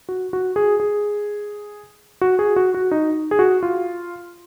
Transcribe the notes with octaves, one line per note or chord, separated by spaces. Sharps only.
F#4
F#4
G#4
G#4
F#4
G#4
F#4
F#4
D#4
G#4
F#4
F4